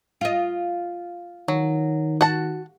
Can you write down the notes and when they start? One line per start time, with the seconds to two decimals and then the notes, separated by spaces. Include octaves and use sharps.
0.21 F4 D#5
1.48 D#3 F#3
2.21 F#4 F#5 A5